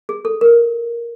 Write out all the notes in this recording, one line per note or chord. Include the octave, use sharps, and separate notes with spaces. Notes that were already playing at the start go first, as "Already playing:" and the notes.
G#4
A4
A#4